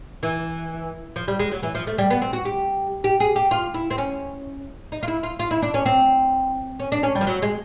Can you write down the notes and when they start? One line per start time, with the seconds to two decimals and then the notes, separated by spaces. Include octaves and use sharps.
0.23 E3
1.16 F3
1.28 G3
1.39 G#3
1.51 F#3
1.63 E3
1.75 F3
1.87 A3
1.98 G3
2.10 B3
2.22 C4
2.33 F#4
2.45 G4
3.04 G4
3.20 G#4
3.36 G4
3.51 F4
3.74 E4
3.90 C4
3.98 C#4
4.92 D#4
5.03 F4
5.08 E4
5.23 F4
5.39 F4
5.51 E4
5.62 D4
5.74 C#4
5.86 C4
6.80 C#4
6.92 D4
7.03 C#4
7.15 G3
7.21 F3
7.27 F#3
7.42 G#3